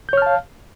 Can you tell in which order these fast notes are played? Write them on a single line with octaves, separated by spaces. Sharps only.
G6 C#5 F6 A5 F5